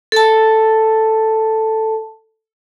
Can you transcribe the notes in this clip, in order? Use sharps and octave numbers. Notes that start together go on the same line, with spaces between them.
A4 A5